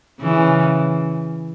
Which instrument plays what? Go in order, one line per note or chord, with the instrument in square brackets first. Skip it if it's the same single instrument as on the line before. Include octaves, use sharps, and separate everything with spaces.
[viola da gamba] C#3 E3